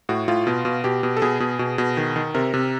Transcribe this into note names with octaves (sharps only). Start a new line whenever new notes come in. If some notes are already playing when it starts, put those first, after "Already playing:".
A2 F#4
A2 F4
B2
B2
B2 G4
B2
A4
B2 G#4
B2
B2
B2
D#3
D#3
C3 A#4
C3